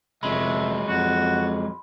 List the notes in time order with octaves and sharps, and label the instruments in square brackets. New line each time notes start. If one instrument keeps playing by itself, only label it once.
[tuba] F1 [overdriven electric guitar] F#3 G#3 [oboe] E5 [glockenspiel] B5 C6
[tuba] F2 [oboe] F#4